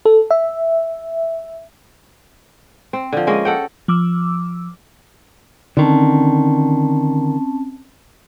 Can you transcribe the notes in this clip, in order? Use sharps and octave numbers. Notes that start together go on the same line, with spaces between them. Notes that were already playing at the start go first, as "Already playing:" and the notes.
A4
E5
C4
D3 F3
G#3 A#3 C#4 D#5
A4 F#5 G5
F3 D6 E6
D3 D#3 C4 C#4 A5